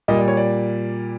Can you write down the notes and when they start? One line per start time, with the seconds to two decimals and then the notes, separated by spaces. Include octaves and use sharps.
0.08 A#2 G3 A#3 D#5
0.17 D5
0.28 C#5
0.37 D5